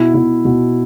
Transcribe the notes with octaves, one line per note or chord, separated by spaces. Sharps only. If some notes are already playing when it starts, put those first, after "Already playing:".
Already playing: B2 E4
B2 E4
B2